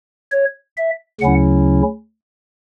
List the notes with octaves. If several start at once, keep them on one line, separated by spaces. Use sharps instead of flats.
C#5
E5
D2 C#3 F#3 C#4 E4 F#5